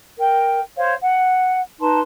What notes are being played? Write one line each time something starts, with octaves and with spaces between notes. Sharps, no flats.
A#4 G5
C5 C#5 F5
F#5
D#4 B4 A5 C6